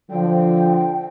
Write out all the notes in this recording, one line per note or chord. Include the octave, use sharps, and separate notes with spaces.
D3 F3 G5